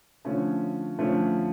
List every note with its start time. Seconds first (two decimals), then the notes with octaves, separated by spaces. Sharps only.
0.25 D3 F3 A3 C#4
0.99 D3 F3 A3 C#4